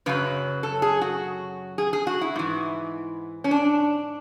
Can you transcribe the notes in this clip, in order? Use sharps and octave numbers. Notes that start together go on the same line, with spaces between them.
F#2 C#3 F#3 B4
A4
G#4
F#4
G#4
G#4
F#4
E4
G#2 E3
C#4
D4